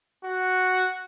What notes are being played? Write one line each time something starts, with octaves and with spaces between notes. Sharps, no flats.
F#4